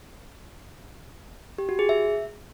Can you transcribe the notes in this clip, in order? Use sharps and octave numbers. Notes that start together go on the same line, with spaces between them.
G4
F#4
G#4
E5